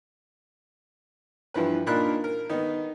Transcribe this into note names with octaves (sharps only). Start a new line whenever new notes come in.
G2 E3 F3 B4
A#2 D4 D#4 A#4 B5 F#6
A#4
D#3 B3 D#4